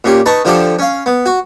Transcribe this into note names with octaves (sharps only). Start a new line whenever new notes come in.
A#2 C#4 G4
D#4 B4 A5 C#6
D3 F3 D4 G4 A4
C#4 F5
B3
F#4